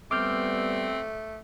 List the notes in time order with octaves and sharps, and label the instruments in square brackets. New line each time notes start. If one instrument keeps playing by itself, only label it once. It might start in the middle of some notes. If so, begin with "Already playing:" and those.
[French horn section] G3 B3 [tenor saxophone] A3 [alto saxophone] C4 [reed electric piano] D6 F6 G6